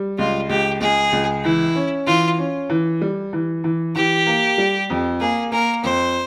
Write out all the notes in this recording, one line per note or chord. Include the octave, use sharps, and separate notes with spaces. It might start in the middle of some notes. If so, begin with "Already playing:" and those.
Already playing: G3
C#2 F4
C#2 G4
C#2 G#4
C#2
E3 E4
C#4
E3 F4
C#4
E3
G3
E3
E3
E3 G4
A#3
G3
F2
A#3 G#4
A#3 A#4
F2 C5